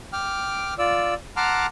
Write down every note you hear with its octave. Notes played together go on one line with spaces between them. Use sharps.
G5 D6 F6
F4 D5 E6
F#5 A5 A#5 C6 D6 F6